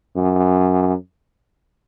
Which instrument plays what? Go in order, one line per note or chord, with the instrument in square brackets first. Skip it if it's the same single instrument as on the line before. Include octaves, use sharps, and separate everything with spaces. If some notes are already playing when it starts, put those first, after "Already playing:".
[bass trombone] F#2